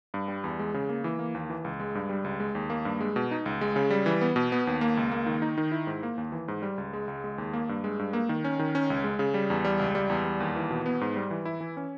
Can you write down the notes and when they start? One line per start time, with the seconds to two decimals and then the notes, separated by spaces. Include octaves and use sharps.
0.14 G2
0.28 G3
0.44 E2
0.59 G#3
0.74 C#3
0.89 A#3
1.04 E3
1.19 A#3
1.35 D#2
1.50 E3
1.65 C#2
1.80 G#3
1.95 G2
2.09 G3
2.24 C#2
2.40 G#3
2.55 D#2
2.70 A#3
2.85 G2
3.01 G#3
3.16 B2
3.31 D#4
3.46 C#2
3.61 G#3
3.76 C#3
3.90 G3
4.06 E3
4.21 B3
4.36 B2
4.52 B3
4.67 D#2
4.81 A#3
4.97 C#2
5.11 A#3
5.26 D#3
5.42 D#4
5.58 D#3
5.72 E4
5.87 G#2
6.03 A#3
6.18 D#2
6.32 E3
6.48 G#2
6.62 G3
6.78 C#2
6.93 G#3
7.08 C#2
7.24 G#3
7.38 D#2
7.53 A#3
7.69 G2
7.84 G#3
7.99 G2
8.13 A#3
8.29 D#3
8.44 C#4
8.59 D#3
8.75 C#4
8.90 C#2
9.04 G#3
9.19 C#3
9.34 G3
9.50 E2
9.64 G3
9.79 C#2
9.95 G3
10.10 E2
10.25 G3
10.40 D#2
10.56 E3
10.70 B2
10.86 B3
11.01 G#2
11.16 G3
11.31 E3
11.45 E4
11.61 E3
11.77 C#4